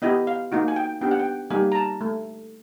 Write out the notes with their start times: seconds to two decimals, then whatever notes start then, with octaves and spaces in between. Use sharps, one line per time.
0.02 B3 E4 G4 D#5
0.27 F5
0.52 A#3 D#4 F#4
0.68 G#5
0.76 G5
1.01 B3 D4 G4 G5
1.11 F#5
1.19 G5
1.50 G3 A#3 D#4 G4 G#5
1.72 A#5
1.75 A5
2.01 A3